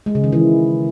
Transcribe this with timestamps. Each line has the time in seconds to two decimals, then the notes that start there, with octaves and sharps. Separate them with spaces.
0.06 G#3
0.15 C#3
0.24 D#3
0.32 E3